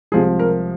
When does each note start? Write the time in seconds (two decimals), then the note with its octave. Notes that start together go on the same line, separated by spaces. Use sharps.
0.12 C2 C3 F3 G#3 G#4
0.39 A#4